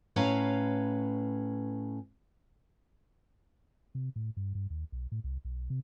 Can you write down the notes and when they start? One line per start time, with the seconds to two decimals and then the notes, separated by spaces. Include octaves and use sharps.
0.16 A2 C#4 B4 F5 A#5
3.95 C3
4.16 A2
4.37 G2
4.55 G2
4.70 D#2
4.92 B1
5.12 A2
5.24 C2
5.45 B1
5.70 C3